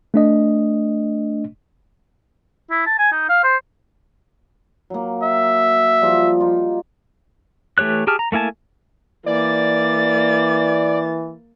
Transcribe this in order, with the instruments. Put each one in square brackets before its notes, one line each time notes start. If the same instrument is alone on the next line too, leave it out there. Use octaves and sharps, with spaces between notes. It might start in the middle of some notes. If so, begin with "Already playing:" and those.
[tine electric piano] A3 D4 D#5
[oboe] E4
A5
G#5
D#4
F5
C5
[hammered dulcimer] F#3 A#3
[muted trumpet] E5
[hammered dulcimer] F3 G3
D#4 F4
[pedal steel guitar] E3 A3 G4 C#5 F#6
G4 G#4 A5 F6
A#5
A3 A#3 E4 G#5 A5
[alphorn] E3 [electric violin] A#3 A6 [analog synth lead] D5